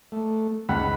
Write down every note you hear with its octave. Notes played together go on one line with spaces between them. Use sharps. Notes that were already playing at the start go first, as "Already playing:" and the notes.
A3
C#2 F#5 B5